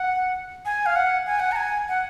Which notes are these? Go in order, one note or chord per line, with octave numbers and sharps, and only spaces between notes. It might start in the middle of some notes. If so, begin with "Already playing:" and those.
Already playing: F#5
G#5
F5
F#5
G#5
F#5
A#5
G#5
F#5